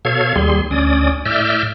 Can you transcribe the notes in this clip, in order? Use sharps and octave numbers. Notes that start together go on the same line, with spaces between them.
B2 A4 C#5 F5 G#6
D#2 G3 G#4 C6
D2 C#4 D5 D#6
A2 D5 E5 E6 F6 G6